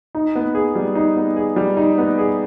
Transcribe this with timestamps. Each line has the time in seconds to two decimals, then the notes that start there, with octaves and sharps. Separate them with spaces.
0.15 D#4
0.36 B3
0.55 G#4
0.75 G3
0.95 D#4
1.16 B3
1.36 G#4
1.56 G3
1.77 D#4
1.98 B3
2.18 G#4